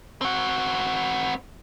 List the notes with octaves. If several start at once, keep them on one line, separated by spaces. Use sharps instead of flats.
C4 F#4